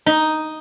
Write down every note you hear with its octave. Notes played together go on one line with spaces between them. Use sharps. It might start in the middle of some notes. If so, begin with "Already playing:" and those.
D#4